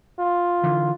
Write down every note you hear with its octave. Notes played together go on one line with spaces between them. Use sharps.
F4
D3 E3